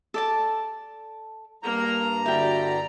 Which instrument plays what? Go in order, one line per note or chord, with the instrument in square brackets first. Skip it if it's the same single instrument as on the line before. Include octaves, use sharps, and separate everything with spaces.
[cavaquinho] A4 D5 A5
[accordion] G2 A#5 [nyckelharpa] A#3
[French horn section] D3 F#4 [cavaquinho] E4 G5 [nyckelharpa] G4 D5